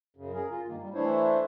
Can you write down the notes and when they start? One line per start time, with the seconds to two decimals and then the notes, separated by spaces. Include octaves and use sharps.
0.16 F#2 C#3
0.34 G#4 A#4
0.51 F4
0.68 G2 D#3 A#3
0.81 G3
0.94 E3 A3 D4 E4 C5 C#5